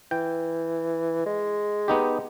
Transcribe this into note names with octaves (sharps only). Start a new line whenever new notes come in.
E3 G5
G#3
B3 D#4 G4